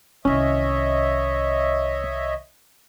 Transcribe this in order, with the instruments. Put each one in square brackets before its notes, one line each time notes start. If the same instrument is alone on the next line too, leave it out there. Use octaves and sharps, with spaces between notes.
[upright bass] C2 D#3 [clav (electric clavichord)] C#4 [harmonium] C#5 D#5 E5